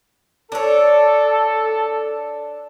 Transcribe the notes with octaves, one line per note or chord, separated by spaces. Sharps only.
D4 A4 C#5